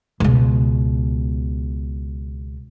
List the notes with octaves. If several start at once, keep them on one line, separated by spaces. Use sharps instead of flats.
C#2 B2